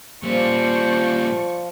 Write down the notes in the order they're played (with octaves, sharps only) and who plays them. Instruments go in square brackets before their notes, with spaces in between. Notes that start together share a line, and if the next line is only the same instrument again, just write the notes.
[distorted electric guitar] A#2 G3 [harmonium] F3 [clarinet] C5 [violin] D5 C#6